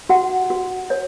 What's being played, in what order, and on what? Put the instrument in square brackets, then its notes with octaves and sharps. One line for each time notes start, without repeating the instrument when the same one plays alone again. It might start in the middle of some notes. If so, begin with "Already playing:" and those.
[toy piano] F#4 F#5
F#4
C#5